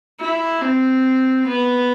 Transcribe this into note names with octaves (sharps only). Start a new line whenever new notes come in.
E4
C4
B3